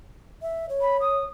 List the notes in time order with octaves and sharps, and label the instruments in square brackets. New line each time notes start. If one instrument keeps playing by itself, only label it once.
[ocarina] E5
C#5
[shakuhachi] B5
D#6